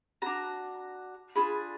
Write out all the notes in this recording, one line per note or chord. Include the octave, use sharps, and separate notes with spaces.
D4 F#4 A#5
D4 F4 G#4 B5